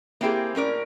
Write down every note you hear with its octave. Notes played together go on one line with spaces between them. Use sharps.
A#3 C4 E4 G4 G#4
A2 C#4 A#4 D5